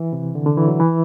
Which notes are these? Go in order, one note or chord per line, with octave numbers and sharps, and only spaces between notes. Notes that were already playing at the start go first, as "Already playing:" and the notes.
Already playing: E3
C3
D3
D3
E3
F#3
E3